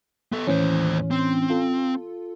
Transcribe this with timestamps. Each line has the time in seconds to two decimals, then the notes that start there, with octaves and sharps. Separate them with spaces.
0.32 B3 A4
0.47 D#2 A2 E3 C#4 C5
1.11 C4
1.50 F4 A4